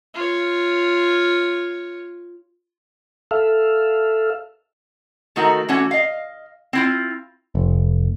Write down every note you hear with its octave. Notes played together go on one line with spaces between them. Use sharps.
F4 C#5
A4 E5 F5
D#3 A3 D#4 F#4 A#4
E3 A3 C#4 F#4
D#5 F5
C4 E4 F4
F1